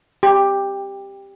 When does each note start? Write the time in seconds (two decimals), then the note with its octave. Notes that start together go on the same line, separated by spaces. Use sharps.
0.23 G4